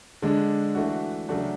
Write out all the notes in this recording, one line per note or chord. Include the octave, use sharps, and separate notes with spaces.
D3 G#3 D4
E3 A3 D4 F#4
C#3 F#3 A3 D4 F#4